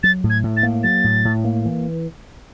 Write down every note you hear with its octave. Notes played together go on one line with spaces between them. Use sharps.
F#3 A6
A2
G#6
A2
A6
A#3
F#3 A6
A2
A2
A#3
E3